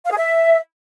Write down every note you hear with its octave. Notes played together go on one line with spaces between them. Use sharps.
F5
G#4
E5